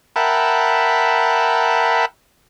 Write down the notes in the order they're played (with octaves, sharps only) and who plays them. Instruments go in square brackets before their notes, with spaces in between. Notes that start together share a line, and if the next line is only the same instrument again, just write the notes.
[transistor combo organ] A#4 E5 F#5 G5 A5 B5